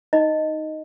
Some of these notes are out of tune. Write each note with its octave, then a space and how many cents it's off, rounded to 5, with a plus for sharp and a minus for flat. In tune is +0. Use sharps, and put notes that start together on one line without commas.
D#4 +0 D#5 +0